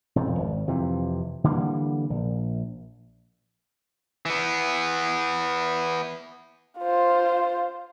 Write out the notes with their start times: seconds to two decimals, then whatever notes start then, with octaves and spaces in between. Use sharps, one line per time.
0.16 E1 F2 G#2
0.39 G#1
0.68 F2 C3 E3
1.44 D3 E3 G3 A#3
2.10 A#1
4.26 E3 B3
6.79 F4 C5